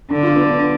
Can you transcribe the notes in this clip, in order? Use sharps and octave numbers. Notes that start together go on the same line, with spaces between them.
D3 D4
F4
B3 D4